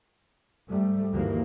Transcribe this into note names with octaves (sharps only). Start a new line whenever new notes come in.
G#2 G3 A3
D2 G2 D#3 E3 G3 A#3